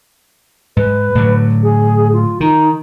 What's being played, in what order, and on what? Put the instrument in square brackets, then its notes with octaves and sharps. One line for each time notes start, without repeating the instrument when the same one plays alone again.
[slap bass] G#2 [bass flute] B4
[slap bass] A2 D3 F#3
[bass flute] G#4
F4
[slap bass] D#3 [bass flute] D#4